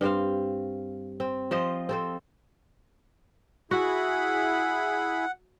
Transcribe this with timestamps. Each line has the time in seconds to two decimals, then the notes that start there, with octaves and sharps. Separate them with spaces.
0.01 G2 C4 C5 F5
1.20 C4
1.51 F3 C5 D#5
1.89 C4 A4 C5
3.71 E4 F#4 G#4 F#5 B5